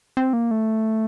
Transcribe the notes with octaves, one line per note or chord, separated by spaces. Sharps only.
C4
A#3
A3